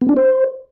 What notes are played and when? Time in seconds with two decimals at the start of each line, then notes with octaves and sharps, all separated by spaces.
0.01 B3
0.09 D4
0.17 C5